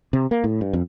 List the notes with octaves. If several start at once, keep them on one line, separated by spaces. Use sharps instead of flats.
C3
A#3
A2
G2
F2